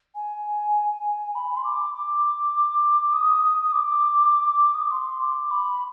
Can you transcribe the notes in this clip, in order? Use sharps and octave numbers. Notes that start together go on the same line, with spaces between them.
G#5
B5
C6
D6
D6
D#6
D#6
D#6
D6
D#6
D6
C6
D6
B5